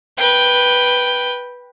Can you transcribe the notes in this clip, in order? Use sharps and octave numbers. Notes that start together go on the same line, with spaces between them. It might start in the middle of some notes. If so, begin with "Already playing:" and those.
B4 G5